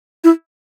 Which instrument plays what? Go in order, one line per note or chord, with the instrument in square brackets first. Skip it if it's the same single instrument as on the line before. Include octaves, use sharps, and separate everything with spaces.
[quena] E4